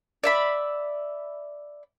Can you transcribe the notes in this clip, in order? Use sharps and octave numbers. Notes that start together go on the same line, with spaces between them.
D5 E5 B5